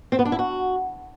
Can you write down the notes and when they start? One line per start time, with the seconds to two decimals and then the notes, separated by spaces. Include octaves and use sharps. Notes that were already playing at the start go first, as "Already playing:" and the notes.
0.12 C4
0.19 B3
0.25 D4
0.32 E4
0.39 F#4